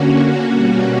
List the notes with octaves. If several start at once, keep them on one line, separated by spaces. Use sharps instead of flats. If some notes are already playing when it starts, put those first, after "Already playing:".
Already playing: D3 A#3 C#4 F#4
B2 G3 A#3 C#4